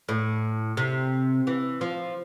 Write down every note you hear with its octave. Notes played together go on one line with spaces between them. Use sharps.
A2
C3
E3
F3